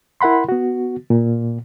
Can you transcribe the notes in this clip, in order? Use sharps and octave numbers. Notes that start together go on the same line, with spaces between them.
E4 A#4 F#5 B5 C6
B3 F#4
A#2